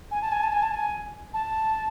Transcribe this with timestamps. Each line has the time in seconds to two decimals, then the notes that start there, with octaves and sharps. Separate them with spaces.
0.11 G#5
0.22 A5
0.32 G#5
0.43 A5
0.52 G#5
0.63 A5
0.74 G#5
1.34 A5